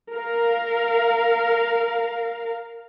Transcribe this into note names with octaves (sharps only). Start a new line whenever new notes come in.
A#4 F5